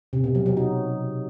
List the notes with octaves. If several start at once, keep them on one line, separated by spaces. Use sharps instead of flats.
C3
B2
F#3
F#3
D#4